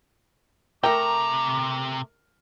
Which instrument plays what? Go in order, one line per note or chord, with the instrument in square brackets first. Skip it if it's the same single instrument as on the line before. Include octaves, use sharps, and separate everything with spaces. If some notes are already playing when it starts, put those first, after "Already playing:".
[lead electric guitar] C3 A#5 [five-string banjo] A3 G5 [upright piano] A#4 [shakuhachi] D6